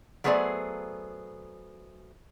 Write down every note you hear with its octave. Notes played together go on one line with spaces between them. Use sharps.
F#3 A3 B3 G#4 C5 D5